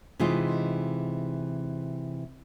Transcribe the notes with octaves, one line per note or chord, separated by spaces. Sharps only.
C3 E3 G#3 D#4 F4